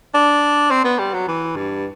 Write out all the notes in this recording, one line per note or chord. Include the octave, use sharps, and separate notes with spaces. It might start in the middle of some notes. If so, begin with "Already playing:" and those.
D4
C4
B3
G3
F#3
E3
G2